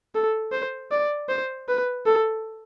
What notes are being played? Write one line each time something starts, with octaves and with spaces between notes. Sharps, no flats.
A4
C5
D5
C5
B4
A4